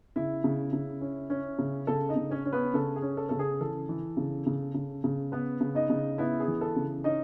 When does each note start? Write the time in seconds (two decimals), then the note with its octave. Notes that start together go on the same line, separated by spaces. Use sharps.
0.16 C#3 E4 E5
0.44 C#3
0.73 C#3
1.01 C#4
1.30 C#4
1.59 C#3
1.87 C#3 A4
2.09 D#4 D#5
2.16 C#3
2.30 C#4 C#5
2.45 C#4
2.53 B3 B4
2.74 C#3 A4
2.96 G#4
3.02 C#4
3.17 A4
3.29 C#3 A4
3.39 G#4
3.60 E3 A4
3.89 E3
4.17 C#3
4.47 C#3
4.74 C#3
5.04 C#3
5.32 B3 B4
5.61 C#3
5.75 D#4 D#5
5.90 C#3
6.18 B3 E4 E5
6.40 G#4
6.48 E3
6.61 A4
6.76 C#3
7.04 C#4 D#4 D#5